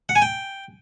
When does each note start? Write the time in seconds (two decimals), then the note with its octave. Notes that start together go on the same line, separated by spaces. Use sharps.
0.09 F#5
0.16 G#5
0.22 G5